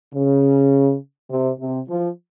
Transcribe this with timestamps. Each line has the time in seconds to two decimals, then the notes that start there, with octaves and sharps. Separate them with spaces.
0.14 C#3
1.31 C3
1.60 C3
1.89 F3